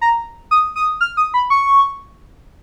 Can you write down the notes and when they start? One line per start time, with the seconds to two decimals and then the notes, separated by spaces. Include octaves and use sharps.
0.01 A#5
0.51 D#6
0.76 D#6
1.01 F6
1.17 D#6
1.34 B5
1.50 C#6